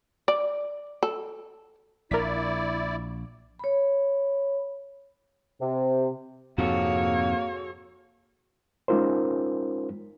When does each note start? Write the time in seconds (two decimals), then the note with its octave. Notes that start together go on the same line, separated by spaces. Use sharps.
0.28 D5
1.03 A4
2.11 A#1 E4 A#4 D5 B6
3.59 C#5 B5
5.59 C3
6.58 F2 G#2 C3 A#3 F#4 G#4 A4 C#5
8.88 G#3 C#4 D#4 F4 A#4 C5